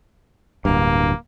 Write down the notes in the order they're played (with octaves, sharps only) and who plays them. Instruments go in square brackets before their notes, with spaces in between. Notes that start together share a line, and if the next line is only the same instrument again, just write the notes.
[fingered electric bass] D1 G2 [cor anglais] A#3